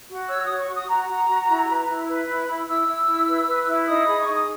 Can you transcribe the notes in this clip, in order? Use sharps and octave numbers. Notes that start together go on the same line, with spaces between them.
F#4
C#5 E6
F#4 D#6
C#6
F#4
D#6
F#4 A#5
F#4
F#4
E4
B4
E4
B4 B5
E4
E4
E4 E6
E4
E4
B4
B4
E4
D#4 D#6
G#4 B5
C#6
D#4
D#6